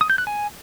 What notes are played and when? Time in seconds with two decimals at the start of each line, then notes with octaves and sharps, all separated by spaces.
0.01 D#6
0.10 G6
0.18 F#6
0.27 G#5